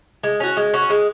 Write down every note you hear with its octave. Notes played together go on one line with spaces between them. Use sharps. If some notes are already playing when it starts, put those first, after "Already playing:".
G#3
C#4 F#4
G#3
C#4 F#4
G#3